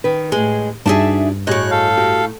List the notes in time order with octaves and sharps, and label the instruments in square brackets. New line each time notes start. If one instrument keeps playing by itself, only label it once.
[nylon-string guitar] D#3 B4
[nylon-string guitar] A2 G#4 [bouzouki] G#3
[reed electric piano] G2 [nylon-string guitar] D4 D#4 F#4 [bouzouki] G#4 E5 A5
[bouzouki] A2 C3 [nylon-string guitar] F#4 G#4 D#5 [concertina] C#5 F#6
[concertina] A4 F5
[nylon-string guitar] F#4 G4